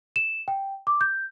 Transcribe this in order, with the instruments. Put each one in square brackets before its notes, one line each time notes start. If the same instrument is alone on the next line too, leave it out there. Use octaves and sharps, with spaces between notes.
[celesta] E7
G5
D6
G6